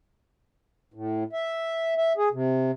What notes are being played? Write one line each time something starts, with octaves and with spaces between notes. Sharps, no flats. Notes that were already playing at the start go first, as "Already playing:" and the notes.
A2
E5
E5
G#4
C3